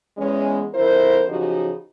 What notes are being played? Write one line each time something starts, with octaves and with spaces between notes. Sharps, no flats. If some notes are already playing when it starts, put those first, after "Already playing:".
E2 G#3 C#4
F2 D3 E4 A#4 C5
C#3 F3 F#3 D#4 F#4 G4